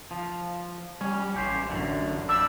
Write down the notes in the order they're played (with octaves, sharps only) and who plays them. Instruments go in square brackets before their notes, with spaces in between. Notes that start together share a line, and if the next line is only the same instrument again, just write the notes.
[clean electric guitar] F3
[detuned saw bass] G3 [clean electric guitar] C#4
[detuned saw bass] A1 [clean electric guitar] C#4 G4 C5
[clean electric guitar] F#2 D3
[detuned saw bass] F2 [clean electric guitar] G3 D4 [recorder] E6